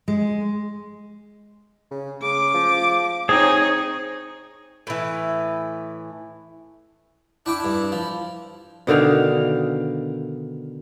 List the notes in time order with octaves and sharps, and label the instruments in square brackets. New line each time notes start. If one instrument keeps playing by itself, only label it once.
[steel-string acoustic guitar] G#3
[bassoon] C#3
[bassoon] C#3 [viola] D6
[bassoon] F3
[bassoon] C4 [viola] D#4 C#5 [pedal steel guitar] G#4
[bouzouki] A2 E3
[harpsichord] D4 G5 D6 [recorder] E4
[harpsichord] G2 D4
F3
[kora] B2 D3 D#3 F5